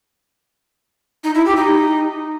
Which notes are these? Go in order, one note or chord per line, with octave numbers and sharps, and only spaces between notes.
D#4
E4
G4
D#4